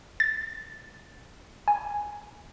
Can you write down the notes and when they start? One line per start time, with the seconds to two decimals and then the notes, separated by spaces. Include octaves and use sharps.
0.20 A6
1.68 G#5